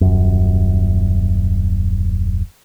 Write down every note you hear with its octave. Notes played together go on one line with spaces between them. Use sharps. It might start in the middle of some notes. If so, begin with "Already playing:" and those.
D#1 F#2